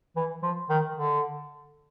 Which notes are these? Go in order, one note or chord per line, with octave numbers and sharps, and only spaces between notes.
E3
F3
D#3
D3